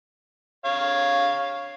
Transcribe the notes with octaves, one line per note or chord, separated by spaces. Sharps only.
C#5 F5